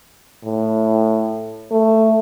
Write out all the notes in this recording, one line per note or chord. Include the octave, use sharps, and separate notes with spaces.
A2
A3